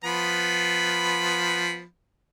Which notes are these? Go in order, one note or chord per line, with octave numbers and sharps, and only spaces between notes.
F3 B3 B5